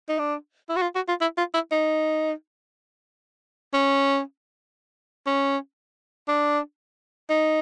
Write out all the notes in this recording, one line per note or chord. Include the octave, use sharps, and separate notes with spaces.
D#4
D4
E4
F#4
F4
F#4
F4
E4
F4
E4
D#4
C#4
C#4
D4
D#4